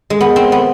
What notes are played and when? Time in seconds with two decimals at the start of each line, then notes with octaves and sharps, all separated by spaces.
0.10 G#3
0.21 B3
0.36 C4
0.52 B3